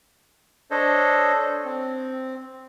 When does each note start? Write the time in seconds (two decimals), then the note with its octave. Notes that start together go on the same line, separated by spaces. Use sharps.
0.71 D4 A4 C5 C#5 D#5
1.65 C4